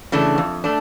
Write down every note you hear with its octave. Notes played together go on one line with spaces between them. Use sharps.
C#3 E3 A3 D4
F2
A3 D4